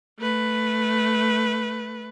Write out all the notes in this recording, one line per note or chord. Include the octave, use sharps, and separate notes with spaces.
A3 B4